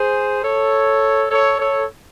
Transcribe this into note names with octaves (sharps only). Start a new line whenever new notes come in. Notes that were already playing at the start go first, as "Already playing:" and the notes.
Already playing: G#4 C5
A4 C#5
A4 C#5
A4 C#5